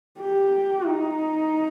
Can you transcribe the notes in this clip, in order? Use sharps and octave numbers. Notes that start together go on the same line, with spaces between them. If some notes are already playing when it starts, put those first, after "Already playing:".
G4
D#4